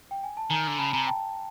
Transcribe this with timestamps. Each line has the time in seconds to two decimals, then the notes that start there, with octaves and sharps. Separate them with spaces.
0.11 G5
0.23 G#5
0.37 A5
0.50 D#3 G#5 A#5
0.67 D3
0.78 C#3 A5 B5
0.93 C3 G#5 A#5
1.07 G5 A5